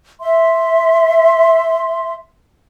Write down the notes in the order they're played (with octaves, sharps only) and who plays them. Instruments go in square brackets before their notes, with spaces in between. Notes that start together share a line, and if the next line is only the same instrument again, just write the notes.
[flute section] E5 C6